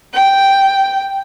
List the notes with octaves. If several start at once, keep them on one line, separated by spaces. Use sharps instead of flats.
G5